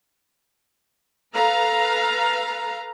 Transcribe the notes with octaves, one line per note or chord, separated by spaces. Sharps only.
A4 B4 F5 A#5